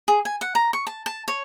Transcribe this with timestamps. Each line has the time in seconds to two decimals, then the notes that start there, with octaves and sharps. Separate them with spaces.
0.08 G#4
0.25 G#5
0.41 F#5
0.55 A#5
0.73 C#6
0.87 A5
1.06 A5
1.28 C#5